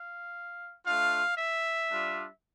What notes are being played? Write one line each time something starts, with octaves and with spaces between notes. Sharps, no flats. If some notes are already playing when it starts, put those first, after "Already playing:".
Already playing: F5
A3 D4 F4 F5
E5
G3 D4 F4